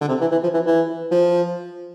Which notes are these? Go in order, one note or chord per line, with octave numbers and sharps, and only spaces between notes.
D3
C3
E3
E3
F3
E3
E3
F3